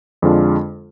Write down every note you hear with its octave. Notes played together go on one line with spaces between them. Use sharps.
F2 D3 G#3 D4 F4